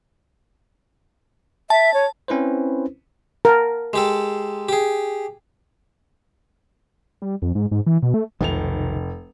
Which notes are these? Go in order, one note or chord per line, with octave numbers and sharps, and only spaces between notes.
E5 A5
C#5
C4 C#4 E4 B4 C5
A#4 F#5 A5
G#3 G4 A4
G4 G#4
G3
F2
G#2
G#2
E3
B2
A3
F1 B1 C3 D#3 F7